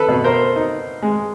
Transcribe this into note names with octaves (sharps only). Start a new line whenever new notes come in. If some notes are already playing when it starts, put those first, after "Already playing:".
Already playing: A4 B4
B2
A#4 C5
D#4
G#3